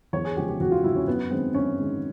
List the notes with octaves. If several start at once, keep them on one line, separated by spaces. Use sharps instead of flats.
E2 C#5
G#4
C#3 F3 G#3 G4
G4
E2 F#4
F4
C#3 F3 G#3 E4
C#4
F#2 B3
D#3 G#3 C4
F#2 C#4
D#3 G#3